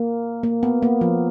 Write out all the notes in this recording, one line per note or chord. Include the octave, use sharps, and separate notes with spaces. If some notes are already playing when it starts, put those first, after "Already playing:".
Already playing: A#3
A#3
B3
A#3
F3